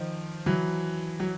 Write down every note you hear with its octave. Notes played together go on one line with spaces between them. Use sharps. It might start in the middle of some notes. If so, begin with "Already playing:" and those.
Already playing: D#3 F3
E3 F#3
F#3